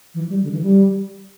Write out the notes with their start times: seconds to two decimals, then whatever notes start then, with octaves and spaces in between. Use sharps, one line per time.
0.14 E3
0.30 G3
0.43 D3
0.53 E3
0.63 G3